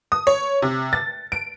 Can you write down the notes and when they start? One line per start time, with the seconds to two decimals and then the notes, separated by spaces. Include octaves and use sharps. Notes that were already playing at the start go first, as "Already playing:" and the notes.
0.12 D#6
0.27 C#5
0.62 C3
0.93 A6
1.32 D7